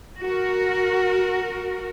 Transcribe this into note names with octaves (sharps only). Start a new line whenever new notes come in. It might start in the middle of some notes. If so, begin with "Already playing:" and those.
F#4 A#4